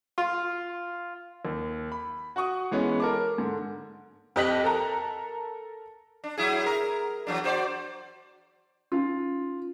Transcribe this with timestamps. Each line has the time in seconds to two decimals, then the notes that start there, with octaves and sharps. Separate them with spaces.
0.18 F4
1.45 D#2
1.92 B5
2.36 F#4 F#5 C#6 D#6
2.71 E3 G#3 B3 C#4
3.00 A#4 A5 D6
3.38 G#2 D3
4.36 F2 G4 D#5 F#6 B6 F#7
4.64 A4 A#4 A#5
6.24 D4
6.37 F#3 E4 G#4
6.66 A#4
7.27 E2 F#3 D4
7.44 F#4 C5 D5
8.92 C#4 D#4 F4